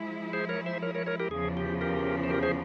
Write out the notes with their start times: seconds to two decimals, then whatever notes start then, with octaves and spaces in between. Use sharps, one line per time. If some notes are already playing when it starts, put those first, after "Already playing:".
Already playing: F3 G#3 E4
0.33 G#4 C5
0.49 A#4 C#5
0.66 C5 E5
0.82 A#4 C#5
0.95 A#4 C#5
1.06 A#4 C#5
1.20 G4 A#4
1.31 E2 C#3 F3 G#4
1.57 G4
1.81 G4 A#4
2.24 C5
2.30 G4 A#4
2.43 G#4 C5